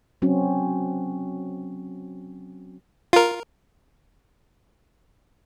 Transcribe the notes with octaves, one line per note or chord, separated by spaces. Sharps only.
F#3 C4 C#4 F#4
F4 A#4